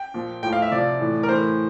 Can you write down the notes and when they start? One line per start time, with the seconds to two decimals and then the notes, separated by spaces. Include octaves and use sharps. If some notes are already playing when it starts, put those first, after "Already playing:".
Already playing: G5
0.14 A#2 F3
0.43 A2 F3 G5
0.53 F5
0.62 E5
0.71 C3 F3 D5
1.00 A2 E3
1.23 A#4
1.29 A2 E3 C5